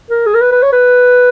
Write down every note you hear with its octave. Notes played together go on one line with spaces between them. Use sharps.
A#4
G#4
A#4
B4
B4
C#5
B4